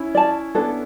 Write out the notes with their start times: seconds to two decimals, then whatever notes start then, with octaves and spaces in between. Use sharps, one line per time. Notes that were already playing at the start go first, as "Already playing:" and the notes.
Already playing: C#4 E4
0.15 D5 A5
0.55 B3 D4 A4